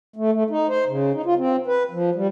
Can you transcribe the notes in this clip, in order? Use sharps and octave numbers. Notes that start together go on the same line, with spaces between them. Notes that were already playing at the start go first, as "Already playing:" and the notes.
A3
A3
D#4
C5
C#3
D#4
F4
C4
B4
F3
G3